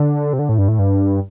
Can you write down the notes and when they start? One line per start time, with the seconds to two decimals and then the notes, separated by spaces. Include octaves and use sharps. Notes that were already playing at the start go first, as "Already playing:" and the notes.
Already playing: D3
0.33 C3
0.39 D3
0.49 A2
0.58 G2
0.68 A2
0.79 G2